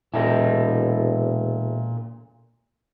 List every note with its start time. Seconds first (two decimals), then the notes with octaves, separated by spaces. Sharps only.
0.14 E1 A#2 E4 A4 D#5